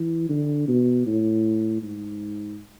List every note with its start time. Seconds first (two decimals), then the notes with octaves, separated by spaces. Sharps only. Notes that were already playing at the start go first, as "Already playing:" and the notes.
Already playing: E3
0.30 D3
0.68 B2
1.06 A2
1.82 G#2